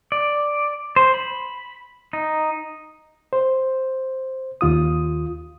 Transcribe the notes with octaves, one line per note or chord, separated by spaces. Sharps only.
D5
C5
B5
D#4
C5
D#2 F4 D#6